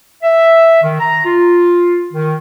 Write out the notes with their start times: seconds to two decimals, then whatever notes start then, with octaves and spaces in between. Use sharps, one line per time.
0.23 E5
0.83 D#3
1.00 A#5
1.25 F4
2.13 D#3